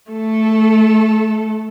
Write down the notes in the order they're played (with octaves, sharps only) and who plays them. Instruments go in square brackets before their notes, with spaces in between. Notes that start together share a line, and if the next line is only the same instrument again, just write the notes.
[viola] A3 A4